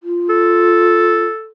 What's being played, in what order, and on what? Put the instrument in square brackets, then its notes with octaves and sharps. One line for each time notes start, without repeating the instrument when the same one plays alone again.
[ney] F4
[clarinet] A4